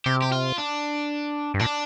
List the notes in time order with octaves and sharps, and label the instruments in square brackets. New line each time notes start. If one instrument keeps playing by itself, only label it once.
[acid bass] C3 [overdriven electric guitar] G4
[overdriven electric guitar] G4
F4
D4
[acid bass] G2
[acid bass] A#2 [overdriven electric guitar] D4